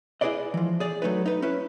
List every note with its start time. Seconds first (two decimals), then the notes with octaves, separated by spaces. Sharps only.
0.21 E4 F#4 G#4 B4 D5 D#5
0.54 E3 F3
0.80 G#4 D5
1.02 F#3 A3 D#4 B4
1.26 D#4 B4
1.42 C#4 E4 B4